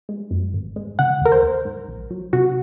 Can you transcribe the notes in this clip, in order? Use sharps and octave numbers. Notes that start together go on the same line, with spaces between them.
G#3
F#2
G#1
G#3
C#3 F#5
D#2 A#4
C5
D#2
G#2
A#1
F#3
C3 F#4